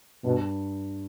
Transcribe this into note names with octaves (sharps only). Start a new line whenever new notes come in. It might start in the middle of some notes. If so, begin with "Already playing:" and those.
G2 B2